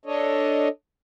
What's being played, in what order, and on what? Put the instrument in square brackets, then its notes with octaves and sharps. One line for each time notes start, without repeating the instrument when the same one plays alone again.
[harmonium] D4 A4 C#5 D#5